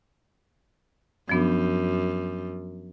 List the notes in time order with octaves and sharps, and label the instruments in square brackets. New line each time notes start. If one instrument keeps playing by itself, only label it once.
[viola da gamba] F#2 [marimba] F3 B3 D4